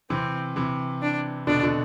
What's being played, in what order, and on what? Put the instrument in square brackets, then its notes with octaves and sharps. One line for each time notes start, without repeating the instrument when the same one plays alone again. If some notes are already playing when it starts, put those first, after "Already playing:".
[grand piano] C3 E3 [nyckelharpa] C4
[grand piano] C3 E3
[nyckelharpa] D4
[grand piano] B2 D3 [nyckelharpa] D4
[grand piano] B2 D3